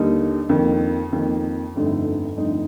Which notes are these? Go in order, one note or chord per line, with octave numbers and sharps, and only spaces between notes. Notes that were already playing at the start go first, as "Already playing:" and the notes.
Already playing: D#2 D3 G3 A#3 D#4
F2 D#3 A#3
F2 D#3 A#3
G1 F2 D3 A3 D#4
G1 F2 D3 A3 D#4